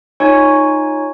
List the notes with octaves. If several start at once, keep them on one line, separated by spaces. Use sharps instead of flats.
D#4 F4 C#5 G#5 C#6